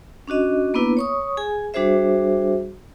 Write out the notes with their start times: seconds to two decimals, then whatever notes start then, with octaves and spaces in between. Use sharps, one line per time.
0.28 C#4 D4 F#4 D#5
0.74 A#3 B3 D4 E4 B4
0.97 C#5 C#6 D#6
1.37 G#4 G#5
1.74 G3 D4 F#4 G#4 C5 E5